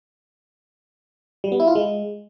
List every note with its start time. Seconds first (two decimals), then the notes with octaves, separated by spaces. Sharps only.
1.44 G3
1.52 B3
1.60 E4
1.68 F4
1.75 G#3